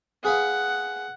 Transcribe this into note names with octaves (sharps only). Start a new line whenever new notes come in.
G#4 B4 F5 F#5